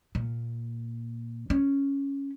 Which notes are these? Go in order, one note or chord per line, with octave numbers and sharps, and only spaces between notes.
A#2
C#4